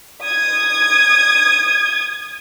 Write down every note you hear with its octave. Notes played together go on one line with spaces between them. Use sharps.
D#6 G#6